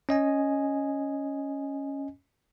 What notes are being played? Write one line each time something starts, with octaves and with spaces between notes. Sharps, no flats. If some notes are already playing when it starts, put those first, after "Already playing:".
C#4 D#5 G#5